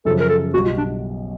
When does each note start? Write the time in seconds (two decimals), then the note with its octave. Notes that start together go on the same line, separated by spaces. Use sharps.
0.05 F#2 C#3 F3 A4
0.20 A#4
0.29 A4
0.54 B1 B2 G3 F#4
0.66 F4
0.78 D4